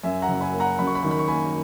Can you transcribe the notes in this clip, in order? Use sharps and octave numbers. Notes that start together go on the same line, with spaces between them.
F#2 E5 G#5
F#5 A#5
F#1
G#5 B5
A#3
F#5 A#5
F#2 B5
C#6
B5
D#3 C#6
B5
C#6
A#3 G#5 B5